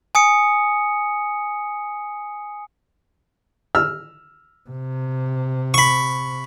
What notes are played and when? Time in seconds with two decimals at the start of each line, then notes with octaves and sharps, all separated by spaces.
0.15 G#5 D#6 C#7
3.75 E6 F6
4.70 C3
5.74 B5 C#6